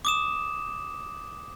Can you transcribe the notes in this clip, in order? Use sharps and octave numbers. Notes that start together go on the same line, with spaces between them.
D6 D#6 E7